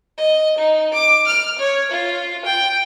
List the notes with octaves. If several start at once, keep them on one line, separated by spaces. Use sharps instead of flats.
D#5
D#4
D6
F6
C#5
F4
G5